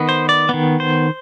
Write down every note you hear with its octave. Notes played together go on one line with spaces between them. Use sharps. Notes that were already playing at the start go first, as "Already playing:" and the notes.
Already playing: D#3 B3
C5
D5
D#3 B3
C5